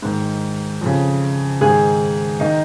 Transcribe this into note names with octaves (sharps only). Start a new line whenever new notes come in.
G#2 D#3
F2 C#3
G#2 D#3 G#4
D#3 D#4